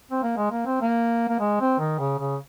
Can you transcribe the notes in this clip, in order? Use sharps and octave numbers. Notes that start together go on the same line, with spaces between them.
C4
A#3
G#3
A#3
C4
A#3
A#3
G#3
C4
D#3
C#3
C#3